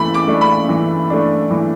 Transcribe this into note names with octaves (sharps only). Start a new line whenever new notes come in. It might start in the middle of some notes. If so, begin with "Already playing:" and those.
Already playing: E3 A3 B5
D6
A3 D4
B5
E3
A3 D4
E3